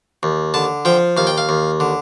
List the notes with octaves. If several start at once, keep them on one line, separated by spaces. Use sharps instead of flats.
D#2
D3 A5
F3 G5
D#2 F5
G5
F5
D#2
D3